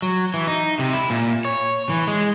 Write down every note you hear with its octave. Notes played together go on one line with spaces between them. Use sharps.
F#3
E3
D#4
C3
E4
A#2
C#5
E3
G#3